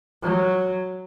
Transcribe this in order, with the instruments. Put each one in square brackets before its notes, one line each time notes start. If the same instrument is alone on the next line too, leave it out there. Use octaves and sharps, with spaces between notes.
[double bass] F#3